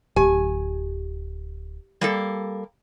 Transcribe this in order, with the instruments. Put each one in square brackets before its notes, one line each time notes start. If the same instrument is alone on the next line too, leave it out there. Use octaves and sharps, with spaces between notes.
[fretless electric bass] D1 [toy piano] G4 [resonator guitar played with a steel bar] G#5
[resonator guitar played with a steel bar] G3 A#3 A4